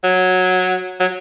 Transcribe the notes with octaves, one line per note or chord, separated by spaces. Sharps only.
F#3
F#3